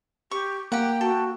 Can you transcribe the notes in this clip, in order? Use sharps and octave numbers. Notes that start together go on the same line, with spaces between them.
G4 C#6
A#3 G4 F#5 G5
F#4 A4